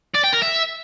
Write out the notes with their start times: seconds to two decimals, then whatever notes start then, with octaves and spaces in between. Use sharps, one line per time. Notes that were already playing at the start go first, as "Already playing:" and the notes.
0.14 D5
0.24 G5
0.33 A#4
0.42 E5